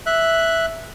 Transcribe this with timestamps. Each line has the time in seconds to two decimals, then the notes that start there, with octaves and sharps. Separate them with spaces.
0.06 E5 F#6